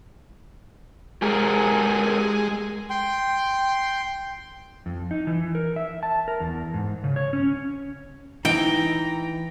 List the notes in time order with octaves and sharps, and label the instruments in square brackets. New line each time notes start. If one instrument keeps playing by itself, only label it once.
[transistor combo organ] G#3 [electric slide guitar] G4 G#4 A#4
[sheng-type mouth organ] G5 C6
[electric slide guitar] F2
D#4
E3
A#4
E5
A5
A#4
E2
G#2
C#3
C#5
C#4
[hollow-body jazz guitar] E3 [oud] D#4 [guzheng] G5 [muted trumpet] A#5